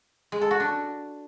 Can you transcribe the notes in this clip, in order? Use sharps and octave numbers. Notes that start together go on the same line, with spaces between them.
G#3
A4
F#4
D4